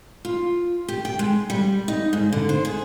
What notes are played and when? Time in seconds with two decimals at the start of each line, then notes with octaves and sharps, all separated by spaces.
0.25 F4
0.88 G4
1.05 G5
1.19 G#3
1.50 G3
1.88 D#4
2.13 G#2
2.33 D3
2.49 C5
2.65 G#4